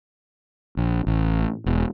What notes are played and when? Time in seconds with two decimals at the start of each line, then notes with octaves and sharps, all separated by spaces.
0.77 A#1
1.07 A1
1.66 E1